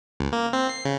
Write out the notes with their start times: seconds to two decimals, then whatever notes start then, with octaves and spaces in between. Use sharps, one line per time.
0.20 C#2
0.32 A#3
0.53 C4
0.69 C7
0.85 C#3